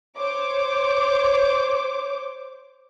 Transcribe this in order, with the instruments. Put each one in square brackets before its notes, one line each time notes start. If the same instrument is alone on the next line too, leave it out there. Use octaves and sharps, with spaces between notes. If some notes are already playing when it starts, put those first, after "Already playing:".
[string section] C5 C#5 D6